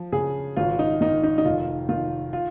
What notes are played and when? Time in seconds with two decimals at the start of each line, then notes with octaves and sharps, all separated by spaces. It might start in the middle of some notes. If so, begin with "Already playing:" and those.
Already playing: F3
0.12 C#3 G#4
0.57 G#1 F4
0.79 D#4
1.01 D#3 D#4
1.24 D#4
1.38 D#4
1.45 F1 F4
1.89 D#3 F4
2.33 F4